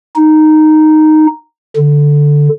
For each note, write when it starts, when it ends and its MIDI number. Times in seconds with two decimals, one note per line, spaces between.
0.16 1.27 63
1.76 2.48 50